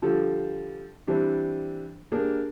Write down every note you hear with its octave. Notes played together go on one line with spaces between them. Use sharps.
D3 F3 G3 A4
E3 G3 C4 D4
A#3 D4 G4 G#4 A#4